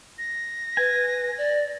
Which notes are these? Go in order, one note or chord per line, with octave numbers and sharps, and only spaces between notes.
A#6
B4 G#5
D5